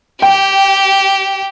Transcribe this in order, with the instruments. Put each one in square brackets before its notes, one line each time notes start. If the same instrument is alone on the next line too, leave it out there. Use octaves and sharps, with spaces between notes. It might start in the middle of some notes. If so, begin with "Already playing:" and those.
[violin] G4 [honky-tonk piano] G5